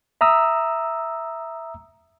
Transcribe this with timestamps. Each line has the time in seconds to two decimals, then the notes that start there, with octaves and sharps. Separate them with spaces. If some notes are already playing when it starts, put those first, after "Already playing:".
0.21 E5 A#5 D#6 E6